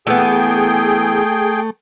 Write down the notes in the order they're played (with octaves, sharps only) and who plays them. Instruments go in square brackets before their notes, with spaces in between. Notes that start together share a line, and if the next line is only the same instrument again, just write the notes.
[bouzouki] E3 B3 [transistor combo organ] A3 [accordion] G#4 G5